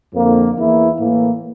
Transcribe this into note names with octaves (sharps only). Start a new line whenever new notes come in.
F2 D3 F3 A#3
E2 E3 A#3 E4
A2 E3 A#3